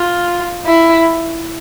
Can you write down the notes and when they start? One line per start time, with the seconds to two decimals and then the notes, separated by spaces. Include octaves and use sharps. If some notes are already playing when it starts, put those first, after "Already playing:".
Already playing: F4
0.65 E4